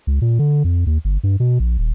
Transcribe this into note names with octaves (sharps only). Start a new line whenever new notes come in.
C#2
A#2
D3
F2
D#2
G1
G2
B2
A#1
D#1